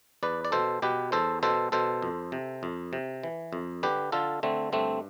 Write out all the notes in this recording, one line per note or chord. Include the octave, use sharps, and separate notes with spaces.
E2 B4 D5
D5
B2 A4 C5
B2 G4 B4
E2 A4 C5
B2 A4 C5
B2 A4 C5
F2
C3
F2
C3
E3
F2
D3 G4 B4
D3 F4 A4
D3 A3 C4
G2 A3 C4